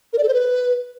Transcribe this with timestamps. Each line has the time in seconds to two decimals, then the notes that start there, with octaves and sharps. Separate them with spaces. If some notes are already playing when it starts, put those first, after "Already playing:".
0.13 A#4
0.18 D5
0.23 A4
0.28 C5
0.33 B4